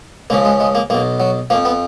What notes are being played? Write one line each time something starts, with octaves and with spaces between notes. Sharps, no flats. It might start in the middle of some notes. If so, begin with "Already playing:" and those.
C#2 C#3 F3 A#3
G#3
G#3
A#3
B1 B2 A#3
F#3
F2 F3 A#3
B3